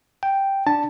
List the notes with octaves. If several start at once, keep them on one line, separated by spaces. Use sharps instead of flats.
G5
D4 A5